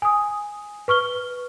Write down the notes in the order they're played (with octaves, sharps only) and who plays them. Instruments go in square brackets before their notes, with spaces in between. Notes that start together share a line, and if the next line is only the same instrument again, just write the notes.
[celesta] G#5 D#6
B4 C#6 F6 G7